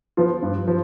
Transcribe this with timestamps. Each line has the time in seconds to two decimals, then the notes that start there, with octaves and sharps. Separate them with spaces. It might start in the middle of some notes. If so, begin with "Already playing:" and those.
0.17 F3 B3 F4
0.42 G2
0.67 F3